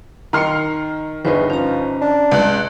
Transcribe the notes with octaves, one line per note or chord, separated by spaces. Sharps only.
D#3 A#5 C6 F6 C7 C#7
G1 E2 D#4 B4 C5 C6 C#6
F3 C#4 A#5
D4
C#2 F#6